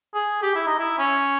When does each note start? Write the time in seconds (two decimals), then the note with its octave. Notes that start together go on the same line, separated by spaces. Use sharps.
0.14 G#4
0.43 G4
0.55 E4
0.67 D#4
0.79 E4
0.98 C#4